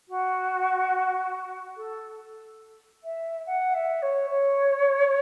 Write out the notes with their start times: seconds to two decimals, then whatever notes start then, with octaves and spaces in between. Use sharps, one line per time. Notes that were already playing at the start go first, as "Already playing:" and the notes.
0.08 F#4
1.76 A4
3.03 E5
3.46 F#5
3.74 E5
4.02 C#5
4.30 C#5